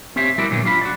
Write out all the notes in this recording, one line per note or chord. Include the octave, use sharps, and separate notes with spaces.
C4 C#4 G4 C#5 E5
G3 E4 F#4 A#4 D5
A#2 D3 F#3 B3
D4 F4 B5
F#4 D5